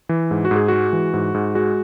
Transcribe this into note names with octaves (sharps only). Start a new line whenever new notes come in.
E3
G#2
F#4
G#2
G#4
G#3 F#4
E3
G#2
G#2
G#3 F#4